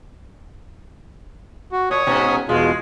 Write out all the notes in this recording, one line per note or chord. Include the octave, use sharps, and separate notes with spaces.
F#4
A#2 C#5 D#6
G#2 B2 C#4
E2 B2 G#3 F4